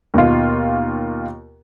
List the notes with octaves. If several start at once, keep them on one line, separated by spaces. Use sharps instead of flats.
D#2 B2 F4